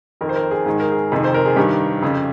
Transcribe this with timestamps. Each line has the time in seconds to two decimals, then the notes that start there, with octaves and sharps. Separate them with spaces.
0.21 F2 D#3 A#4
0.29 C5
0.36 A#4
0.51 G#4
0.66 G#2 D#3 G#4
0.80 A#4
0.92 G#4
1.12 F2 C3 D#3
1.24 C5
1.34 A#4
1.46 G#4
1.56 G2 D#3 G4
2.02 F2 C#3